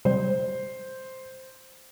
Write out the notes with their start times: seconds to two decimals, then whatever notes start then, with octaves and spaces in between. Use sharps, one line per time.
0.05 C3 G3 C5